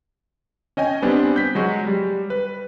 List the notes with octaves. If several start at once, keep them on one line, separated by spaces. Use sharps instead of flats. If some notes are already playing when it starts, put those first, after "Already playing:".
C#4 D#5 G5 G#5
G3 B3 C4 D4
G6 B6
F#3 G#3 F#4
G3
B4